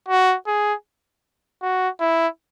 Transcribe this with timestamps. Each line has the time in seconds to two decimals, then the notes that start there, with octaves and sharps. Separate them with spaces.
0.08 F#4
0.47 G#4
1.62 F#4
2.00 E4